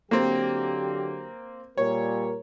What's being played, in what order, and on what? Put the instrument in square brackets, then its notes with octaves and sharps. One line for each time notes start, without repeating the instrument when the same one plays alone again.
[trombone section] D3 F#3 G4 [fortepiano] A#3 C4
[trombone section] A#2 G3 A#4 [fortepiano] C#5